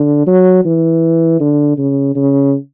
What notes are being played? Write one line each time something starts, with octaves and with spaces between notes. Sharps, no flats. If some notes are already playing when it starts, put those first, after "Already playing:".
Already playing: D3
F#3
E3
D3
C#3
C#3